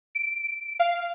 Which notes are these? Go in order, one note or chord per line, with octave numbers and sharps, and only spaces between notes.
D7
F5